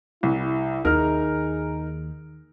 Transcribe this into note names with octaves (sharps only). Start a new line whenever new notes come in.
C2 E4
D#2 D#4 G#4 A#4 F6